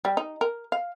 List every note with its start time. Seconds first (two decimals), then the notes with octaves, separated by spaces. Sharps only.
0.05 G3
0.17 D#4
0.41 A#4
0.72 F5